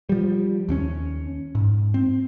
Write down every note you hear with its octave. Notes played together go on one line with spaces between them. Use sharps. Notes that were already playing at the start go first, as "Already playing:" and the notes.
F3 G3
D#2 C4 C#4
G#2
C4